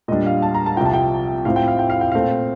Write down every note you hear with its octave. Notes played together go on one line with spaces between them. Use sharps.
A#2 G3 D4 D#5
F5
A5
A#5
A5
C2 C3 F3 G5
A5
G5
A2 F3 C4 F5
G5
F5
G5
F5
G5
A#2 A3 C4 F5